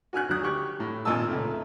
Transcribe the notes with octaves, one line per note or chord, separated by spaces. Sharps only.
F#4 G#5 F6 F#6
D2 F#3 D#6 F#6
G4 C#6 F#6
A2
G#1 A#2 D#5 G#5 A5 E6
C#2 A#2 A3